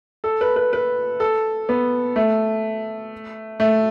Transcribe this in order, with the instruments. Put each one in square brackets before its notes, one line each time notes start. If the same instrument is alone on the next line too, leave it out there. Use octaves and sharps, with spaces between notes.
[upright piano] A4
B4
B4
B4
A4
B3
A3
A3